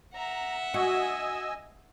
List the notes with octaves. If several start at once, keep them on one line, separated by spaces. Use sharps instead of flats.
E5 F#5 A#5
F#4 D#5 G#5 E6